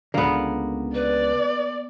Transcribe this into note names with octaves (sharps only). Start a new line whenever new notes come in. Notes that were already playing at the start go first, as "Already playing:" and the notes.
C#2 D3 A#3 B3
B4 D5